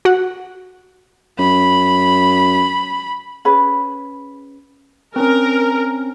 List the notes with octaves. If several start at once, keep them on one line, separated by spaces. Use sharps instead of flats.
F#4 F#5
F#2 B5
C#4 G#4 B4 B5
C4 C#4 A#4